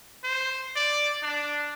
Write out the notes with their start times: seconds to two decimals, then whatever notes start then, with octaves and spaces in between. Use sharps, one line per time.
0.24 C5
0.76 D5
1.23 D4